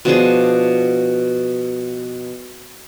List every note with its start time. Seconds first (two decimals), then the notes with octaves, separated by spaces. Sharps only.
0.05 B2 F3 D4 G#4